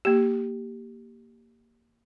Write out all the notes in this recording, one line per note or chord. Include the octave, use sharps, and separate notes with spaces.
A#3 G4